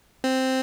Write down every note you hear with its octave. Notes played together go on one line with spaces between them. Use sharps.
C4